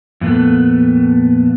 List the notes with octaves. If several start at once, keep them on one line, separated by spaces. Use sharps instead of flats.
F2 A#2 A3 B3